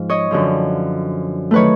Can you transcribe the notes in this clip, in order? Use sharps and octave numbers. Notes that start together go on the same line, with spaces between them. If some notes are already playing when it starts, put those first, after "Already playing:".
Already playing: G#2 F3
C#5 D#5
F#2 D3 F3
D#3 F#3 A3 B4 C#5